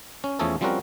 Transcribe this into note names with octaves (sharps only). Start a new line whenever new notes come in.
C#4
E2 F3 A3 C#4 G#4 A4
F3 G3 C4 C#4 F#4 A#4